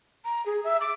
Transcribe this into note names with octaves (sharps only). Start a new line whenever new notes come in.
A#5
G#4
E5
D6